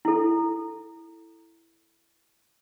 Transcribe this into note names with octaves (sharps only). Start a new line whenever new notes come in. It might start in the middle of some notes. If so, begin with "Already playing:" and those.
E4 A4